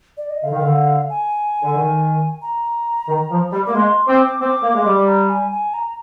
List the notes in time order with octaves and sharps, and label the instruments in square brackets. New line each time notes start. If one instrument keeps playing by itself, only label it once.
[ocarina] D5
D#5
[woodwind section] D3 [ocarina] F5
[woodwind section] D#3
D3
[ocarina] G#5
[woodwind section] D3
D#3
[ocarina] A#5
[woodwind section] D#3
F3
G3
[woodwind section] A#3 [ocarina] D6
[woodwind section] G#3 [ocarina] C6
[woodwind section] C4 [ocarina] D6
[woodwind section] C4 [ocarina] D6
[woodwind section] A#3
G#3
G3
[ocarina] A#5
G#5
G#5
A#5